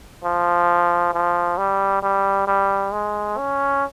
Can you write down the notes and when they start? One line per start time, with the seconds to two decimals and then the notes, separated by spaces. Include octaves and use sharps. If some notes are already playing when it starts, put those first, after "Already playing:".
0.24 F3
1.14 F3
1.58 G3
2.03 G3
2.47 G3
2.92 G#3
3.37 C#4